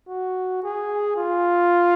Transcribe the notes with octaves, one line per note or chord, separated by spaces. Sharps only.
F#4
G#4
F4